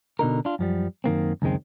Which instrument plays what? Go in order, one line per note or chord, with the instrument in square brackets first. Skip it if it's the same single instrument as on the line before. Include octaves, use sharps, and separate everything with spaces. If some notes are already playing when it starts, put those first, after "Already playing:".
[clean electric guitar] B2 D3 D#4 A#4
D4 F4
F#2 F3 G3
F#2 D#3 A#3 C4
C#2 F#2 D#3 G#3 C4